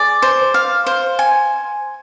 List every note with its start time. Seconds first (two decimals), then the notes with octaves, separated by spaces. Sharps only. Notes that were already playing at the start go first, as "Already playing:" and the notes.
Already playing: G#4 D5
0.22 C5
0.54 F5
0.86 C5
1.19 G#5